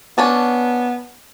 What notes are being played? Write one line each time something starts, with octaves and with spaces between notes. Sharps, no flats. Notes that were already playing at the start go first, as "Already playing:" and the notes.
B3 C#4 D4 A5